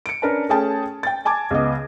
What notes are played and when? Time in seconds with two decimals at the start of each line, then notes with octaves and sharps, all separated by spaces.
0.06 C#7 D7
0.22 C#4 D4 A#4 B4 A5
0.49 A3 C#4 G#4 G5 A5
1.03 G5 A6
1.25 G#5 A5 D6 G#6
1.51 C#2 B3 D#5